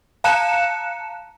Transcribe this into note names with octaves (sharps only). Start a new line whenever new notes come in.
F5 A5 A#5 F#6 C#7 E7